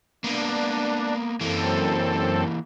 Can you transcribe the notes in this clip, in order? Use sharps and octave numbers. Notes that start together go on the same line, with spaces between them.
A#3 B3 D4
F#2 E3 A#3 C4 A4